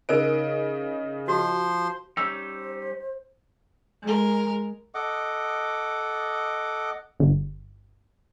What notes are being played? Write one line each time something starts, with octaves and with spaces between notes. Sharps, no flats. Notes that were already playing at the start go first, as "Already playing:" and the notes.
C#3 D#4 A#4 C5 D#5 D7
F3 F#4 C5 C6
G3 C#4 D#4 C5 E6
G#3 A#4
A4 D#5 F#5 D6
G1